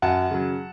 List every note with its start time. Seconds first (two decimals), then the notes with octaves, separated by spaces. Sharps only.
0.02 F#2 F#5 A5
0.31 C#3 F#3